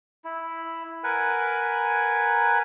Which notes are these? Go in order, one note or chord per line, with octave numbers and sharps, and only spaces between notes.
E4
A#4 B4 F#5 G#5